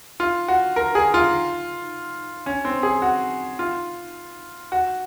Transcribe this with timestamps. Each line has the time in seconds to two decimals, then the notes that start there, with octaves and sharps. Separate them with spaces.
0.20 F4
0.48 F#4
0.76 A#4
0.95 G#4
1.14 F4
2.46 C#4
2.65 C4
2.83 G#4
3.02 F#4
3.59 F4
4.72 F#4